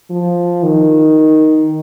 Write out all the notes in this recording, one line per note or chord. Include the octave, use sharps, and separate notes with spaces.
F3
D#3